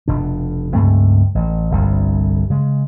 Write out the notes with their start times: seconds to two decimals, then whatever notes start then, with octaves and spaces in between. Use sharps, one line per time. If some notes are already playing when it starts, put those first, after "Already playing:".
0.08 F1 B2 D4
0.74 C#2 G2 A3 C4
1.35 A1
1.71 G1 C2 G2
2.50 C#3 G#3